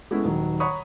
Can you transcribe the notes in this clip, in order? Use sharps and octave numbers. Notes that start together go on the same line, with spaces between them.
G#3 A3 B3 C#4 E4
D#1 D#3 F#3
C#5 F#5 A#5 B5 C#6 D#6